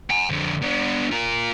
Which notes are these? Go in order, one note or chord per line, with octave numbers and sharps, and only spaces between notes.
F#5 G#5
F2 D3
B3 D4
F4 A#4